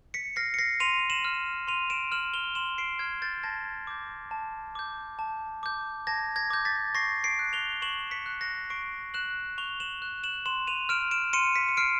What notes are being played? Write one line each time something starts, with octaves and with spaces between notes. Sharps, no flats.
B6 C#7
F6 A#6 C7
C#7
A#6 C7
C6 D#7 F7
E7 F#7
F6
C6 D#7 F7
D7 E7
F6 E7 F#7
F7 G7
C6 E7 F#7
C7 D7
F6 G#6
G6 A6
A5 G#6 A#6
D6 G6
A5
D6 G6
A5
D6 G6
A5 G#6 A#6
G#6 A#6
D6 G6
A6 B6
C#6 A#6 C7
C7 D7
F#6
F7 G7
C#6 E7 F#7
B6 C#7
F#6
A#6 C7
C#6 C7 D7
F#6 E7 F#7
C#6 F7 G7
E7 F#7
F#6
E7 F#7
C6 E7 F#7
D#7 F7
F6 D7 E7
D7 E7
C6 C#7 D#7
B6 C#7
C#7
F6 C7 D7